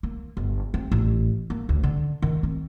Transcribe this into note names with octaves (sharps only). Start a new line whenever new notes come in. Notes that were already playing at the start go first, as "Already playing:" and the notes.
A#3
G1
C4
A1
A#3
D2
D3
D#3
C4